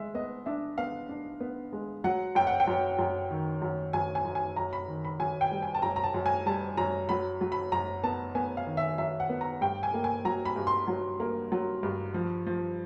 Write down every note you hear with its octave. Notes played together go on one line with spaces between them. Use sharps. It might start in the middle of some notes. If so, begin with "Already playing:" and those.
Already playing: G#3 E5
B3 D#5
D4 E5
B3 F5
D4
B3
G#3
F#3 F#5
F#2 G5
F#5
G5
F#2
F#2
D#3
F#2
F#2 G#5
G#5
F#2
G#5
F#2 A#5
B5
D#3
B5
F#2 G#5
G5
G3
G#5
A5
F#2 A#5
A#5
A5
F#2
G#5
G3 A5
F#2 A#5
F#3 B5
F#3
B5
F#2 A#5
B3 A5
B3 G#5
F5
D#3
E5
F#2 E5
F#5
B3
A#5
G2 G5
G#5
A#3
G#5
F#3 A#5
B5
G2
C6
F#3
A#3
F#3
G2
F3
F3